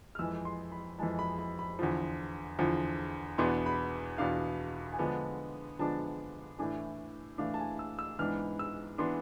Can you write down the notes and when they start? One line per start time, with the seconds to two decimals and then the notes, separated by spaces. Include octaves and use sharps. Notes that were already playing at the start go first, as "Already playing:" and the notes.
0.15 F6
0.19 F2 E3 G#3 E6
0.45 C6
0.72 B5
0.98 F2 E3 G#3 A5
1.19 B5
1.39 B5
1.59 B5
1.79 E2 D3 F3
2.59 E2 D3 F3
3.38 E2 B2 B3 D4 C6
3.66 B5
4.18 E2 B2 B3 D4 F5
4.93 G#5
4.99 D3 F3 G#3 B3 D4 A5
5.79 D3 F3 G#3 B3 D4 A5
6.59 A2 E3 A3 D4 G#5
7.38 A2 E3 A3 D4 F5
7.54 A5
7.59 G#5
7.79 E6
7.99 E6
8.19 G#2 E3 B3 D4 F6
8.59 E6
8.98 E3 B3 D4 C6